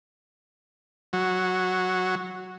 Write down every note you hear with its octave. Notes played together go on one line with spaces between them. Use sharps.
F#3